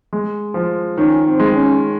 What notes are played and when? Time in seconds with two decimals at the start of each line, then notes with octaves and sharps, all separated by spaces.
0.13 G#3
0.54 F3
0.97 D#3 C#4
1.25 C4
1.40 G#3
1.54 C#4